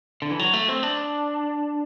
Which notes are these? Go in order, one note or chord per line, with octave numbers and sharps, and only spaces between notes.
D3
E3
F#3
A3
C4
D4